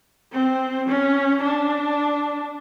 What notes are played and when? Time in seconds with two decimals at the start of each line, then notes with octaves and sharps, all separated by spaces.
0.32 C4
0.88 C#4
1.42 D4